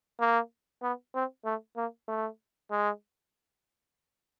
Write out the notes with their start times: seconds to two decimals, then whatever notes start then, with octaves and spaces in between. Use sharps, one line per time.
0.20 A#3
0.83 B3
1.15 C4
1.45 A3
1.77 A#3
2.08 A3
2.71 G#3